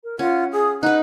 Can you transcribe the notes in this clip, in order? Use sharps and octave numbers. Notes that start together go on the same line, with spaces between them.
A#4
C#4 F4 F#5
G#4 D#6
D#4 B4 F#5 F#6